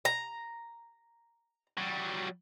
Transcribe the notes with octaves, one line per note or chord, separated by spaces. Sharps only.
A#5
F#3 G3